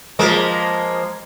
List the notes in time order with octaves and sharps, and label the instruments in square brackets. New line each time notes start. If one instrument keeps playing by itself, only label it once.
[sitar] F3 G#3 A#3